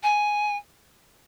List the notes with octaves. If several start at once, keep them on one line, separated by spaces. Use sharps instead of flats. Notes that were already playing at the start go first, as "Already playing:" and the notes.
G#5